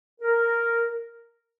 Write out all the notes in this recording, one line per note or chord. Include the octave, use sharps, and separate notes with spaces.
A#4